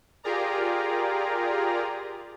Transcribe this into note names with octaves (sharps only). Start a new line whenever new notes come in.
F4 G4 G#4 A#4 D5 A#5